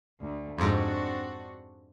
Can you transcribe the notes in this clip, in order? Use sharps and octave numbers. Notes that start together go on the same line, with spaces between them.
D2
F2 G#2 C4 D4 F#4